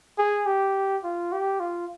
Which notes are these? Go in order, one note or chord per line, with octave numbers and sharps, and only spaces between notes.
G#4
G4
F4
G4
F4